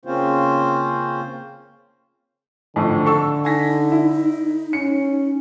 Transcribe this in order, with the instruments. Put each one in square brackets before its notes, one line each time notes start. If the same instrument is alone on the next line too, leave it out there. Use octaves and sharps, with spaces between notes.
[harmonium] C#3 A#3 C4 C#4 F4 C5
[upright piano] F2 A2 D#3 [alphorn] D3
[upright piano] A4 C#6 E6
[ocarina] D#4 [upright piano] G#5 A#6 B6
[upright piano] E4
[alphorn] C#4 [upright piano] C#7